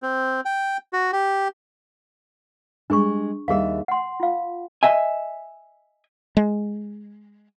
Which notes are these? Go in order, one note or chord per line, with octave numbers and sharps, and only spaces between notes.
C4
G5
F#4
G4
G3 G#3 D4 G#4 C#6
D#2 G3 G#4 E5 F5
F#5 C6
F4 F5
D#5 E5 G#5
G#3